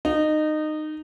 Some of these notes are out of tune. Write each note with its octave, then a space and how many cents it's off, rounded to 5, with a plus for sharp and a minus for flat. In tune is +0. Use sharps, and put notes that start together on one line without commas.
D#4 -20